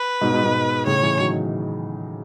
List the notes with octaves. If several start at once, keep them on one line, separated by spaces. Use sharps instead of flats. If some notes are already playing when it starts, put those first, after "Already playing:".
Already playing: B4
G#2 B2
G#2 B2
G#2 B2
A2 C#3 C#5
C#3 E3
D#3 F#3